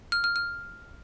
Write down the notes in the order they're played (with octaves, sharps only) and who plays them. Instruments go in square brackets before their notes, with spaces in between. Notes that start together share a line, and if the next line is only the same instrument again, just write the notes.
[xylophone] F6
F6
F6